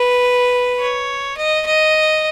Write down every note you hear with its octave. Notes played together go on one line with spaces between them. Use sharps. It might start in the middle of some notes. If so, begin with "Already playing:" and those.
Already playing: B4
C#5
D#5
D#5